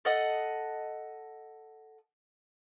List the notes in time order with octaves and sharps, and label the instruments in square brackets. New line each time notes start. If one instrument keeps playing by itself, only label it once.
[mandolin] A4 D#5 F#5